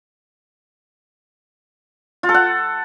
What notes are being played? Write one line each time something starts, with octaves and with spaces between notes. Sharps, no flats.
F4
A4
F#5